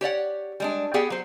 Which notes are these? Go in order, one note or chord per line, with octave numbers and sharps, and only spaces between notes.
G4 C#5 D5 F#5
G3 G#3 D4
B3 G4 G#4 D5 F#5 G5
F#3 C5